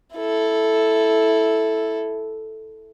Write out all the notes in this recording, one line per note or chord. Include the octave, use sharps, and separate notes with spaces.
E4 A4